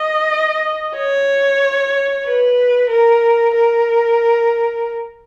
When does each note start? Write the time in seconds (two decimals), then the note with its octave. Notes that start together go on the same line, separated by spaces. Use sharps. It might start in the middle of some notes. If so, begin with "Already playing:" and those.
Already playing: D#5
0.96 C#5
2.26 B4
2.90 A#4
3.55 A#4